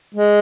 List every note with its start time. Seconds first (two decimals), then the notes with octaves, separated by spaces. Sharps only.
0.14 G#3